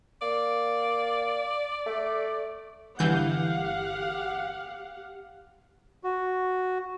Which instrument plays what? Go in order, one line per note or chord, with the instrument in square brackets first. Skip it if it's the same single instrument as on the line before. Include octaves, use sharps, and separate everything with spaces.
[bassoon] A#3 [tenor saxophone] D5
[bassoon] A3
[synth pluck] G1 E3 G6 [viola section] G4 F5 F#5
[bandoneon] F#4